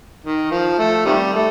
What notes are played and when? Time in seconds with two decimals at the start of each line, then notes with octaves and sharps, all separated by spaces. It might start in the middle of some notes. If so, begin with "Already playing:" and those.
0.24 D#3
0.51 F3
0.78 A3
1.06 C3 D#3 G3
1.33 A3